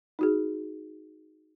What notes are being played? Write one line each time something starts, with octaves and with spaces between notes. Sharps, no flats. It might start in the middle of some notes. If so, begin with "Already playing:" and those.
D#4 F#4 G#4